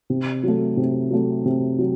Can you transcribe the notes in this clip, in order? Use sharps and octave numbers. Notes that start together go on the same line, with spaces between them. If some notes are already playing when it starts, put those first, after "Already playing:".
C3
F#3 A3
C3
F#3 A3
C3
F#3